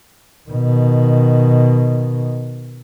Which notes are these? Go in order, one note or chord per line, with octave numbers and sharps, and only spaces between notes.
B2 D#3